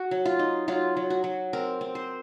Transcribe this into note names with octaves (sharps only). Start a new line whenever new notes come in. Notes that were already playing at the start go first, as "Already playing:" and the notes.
Already playing: F#4
F#3
F4
D#4
F#3 F4
F#3
F#4
F#3
C4 A#4
C4
C5